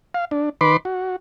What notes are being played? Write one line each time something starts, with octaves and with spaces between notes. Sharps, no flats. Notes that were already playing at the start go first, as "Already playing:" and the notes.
F5
D4
D#3 B4 B5 C6 D6
F#4